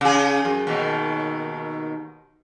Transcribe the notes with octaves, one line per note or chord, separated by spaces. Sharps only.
C#3 G#4
F#2
D#2 B2 D#3